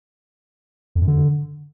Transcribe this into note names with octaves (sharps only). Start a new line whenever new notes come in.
F2
F#2
D3